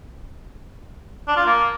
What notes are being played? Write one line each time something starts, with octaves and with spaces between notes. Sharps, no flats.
D4
F4
A#3